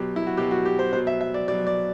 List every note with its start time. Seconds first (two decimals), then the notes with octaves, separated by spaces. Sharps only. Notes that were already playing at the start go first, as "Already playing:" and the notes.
Already playing: B2 F#3 G4
0.16 E4
0.27 F#4
0.37 B2 G4
0.41 F#3
0.51 F#4
0.65 G4
0.79 C5
0.93 B2 C5
0.96 F#3
1.07 E5
1.21 E5
1.34 D5
1.48 B2 F#3 D5
1.67 D5